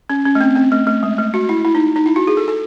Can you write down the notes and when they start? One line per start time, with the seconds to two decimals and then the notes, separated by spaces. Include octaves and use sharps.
0.10 C#4
0.25 C#4
0.35 A3
0.41 C4
0.56 C4
0.72 A3
0.87 A3
1.03 G#3
1.18 A3
1.34 F#4
1.49 E4
1.65 E4
1.75 D#4
1.96 D#4
2.06 E4
2.16 F#4
2.27 G#4
2.37 A4
2.48 A4